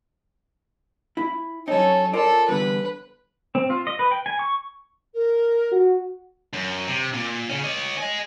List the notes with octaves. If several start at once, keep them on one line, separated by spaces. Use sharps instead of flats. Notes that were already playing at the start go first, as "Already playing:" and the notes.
E4
F#3 C#4 D#4 A4
F4 A4 A#4 D5
E2 G2 D3 B4
C4
F4
D#5
B4
G5
G#5
C#6
A#4
F#4
F#2
C3
A#2
C#3 C#4
C#5 D#5
D#5 G#5